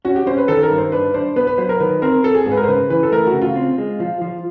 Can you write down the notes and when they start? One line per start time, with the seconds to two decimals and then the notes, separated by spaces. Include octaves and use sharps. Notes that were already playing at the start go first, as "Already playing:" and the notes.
0.05 C#4 F#4
0.16 G4
0.27 C#4 C5
0.38 B4
0.48 D#3 A4
0.63 A#4
0.71 G2
0.78 C5
0.92 D4 B4
1.14 D4 C5
1.36 B3 B4
1.47 B4
1.58 F#3 C5
1.69 A#4
1.80 D#3 B4
2.02 C4 A#4
2.24 C4 A4
2.35 G#4
2.46 G#2 G#4
2.52 B4
2.57 A#4
2.64 C5
2.68 C#3 B4
2.90 E3 B4
3.03 A4
3.12 A3 A#4
3.27 F#4
3.33 C#3
3.42 F4
3.56 C4
3.78 G#3
4.00 F3
4.22 F3